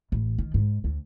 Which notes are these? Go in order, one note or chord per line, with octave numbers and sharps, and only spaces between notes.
A1
D#3
G#2
D2